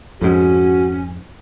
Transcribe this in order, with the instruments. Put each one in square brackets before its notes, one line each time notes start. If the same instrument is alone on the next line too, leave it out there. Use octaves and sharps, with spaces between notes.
[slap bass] F2 G#2 [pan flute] C#4 [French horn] F#4